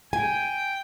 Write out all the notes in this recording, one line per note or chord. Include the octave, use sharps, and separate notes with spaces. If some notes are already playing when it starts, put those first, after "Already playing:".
G5 G#5